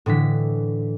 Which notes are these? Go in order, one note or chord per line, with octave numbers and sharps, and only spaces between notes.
A2 D3 E3 B6